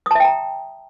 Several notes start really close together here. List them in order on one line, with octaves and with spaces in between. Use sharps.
D#6 A5 E5 G5 A#5